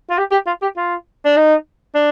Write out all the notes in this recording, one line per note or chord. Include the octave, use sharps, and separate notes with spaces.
F4
G4
G4
F4
G4
F4
D4
D#4
D4